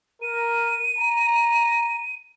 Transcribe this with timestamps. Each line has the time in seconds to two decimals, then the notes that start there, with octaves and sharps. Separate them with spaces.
0.22 A#4 D#7
0.99 A#5